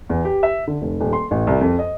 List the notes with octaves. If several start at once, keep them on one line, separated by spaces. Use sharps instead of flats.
E2
G4
E5
D3
F1
D#1
C6
A1
C2
F2
D#5